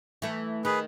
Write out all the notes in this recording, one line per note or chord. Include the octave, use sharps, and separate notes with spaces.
E3 A3
D#3 G#4 B4